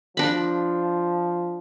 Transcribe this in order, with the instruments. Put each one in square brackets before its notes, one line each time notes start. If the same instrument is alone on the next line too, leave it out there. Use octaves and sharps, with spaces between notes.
[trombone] F3 [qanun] D4 B5